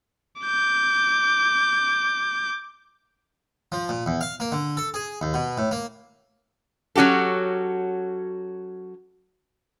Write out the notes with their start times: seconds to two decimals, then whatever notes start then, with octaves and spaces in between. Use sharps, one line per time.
0.42 D6 G6
3.72 F3
3.89 A#2
4.06 E2
4.21 F5
4.40 A#3
4.52 D3
4.77 A4
4.94 G#4
5.21 D#2
5.34 B2
5.58 A2
5.71 A#3
6.96 F#3 C#4 F#4 G4 A4